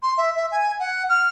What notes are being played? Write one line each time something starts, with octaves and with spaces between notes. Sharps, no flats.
C6
E5
E5
G#5
F#5
F6